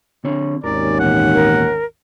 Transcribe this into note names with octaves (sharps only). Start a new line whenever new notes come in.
D3 C4 C#5
G#1 D#2 C#4 A#4 D5
E2 A#2 F#5
A#4